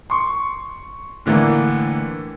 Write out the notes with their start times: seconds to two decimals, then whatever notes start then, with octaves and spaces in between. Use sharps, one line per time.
0.10 C6 C#6
1.26 A2 D3 E3 A3 A#3